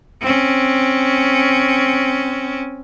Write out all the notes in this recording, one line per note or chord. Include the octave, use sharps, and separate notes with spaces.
C4 C#4